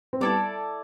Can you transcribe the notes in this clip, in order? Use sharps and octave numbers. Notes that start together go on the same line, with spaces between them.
C4
G3 B3 E4 A4 D5